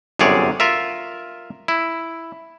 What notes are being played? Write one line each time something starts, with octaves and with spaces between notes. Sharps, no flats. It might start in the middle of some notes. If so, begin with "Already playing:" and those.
G1 F#2 C3 G#4 C#5 D5
F4 A#4 E5
E4